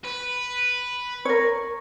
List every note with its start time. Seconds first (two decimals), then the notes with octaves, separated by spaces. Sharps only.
0.04 B4
1.25 A#4 C#5